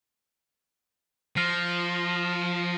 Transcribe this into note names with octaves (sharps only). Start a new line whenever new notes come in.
F3 F6 A#6 C7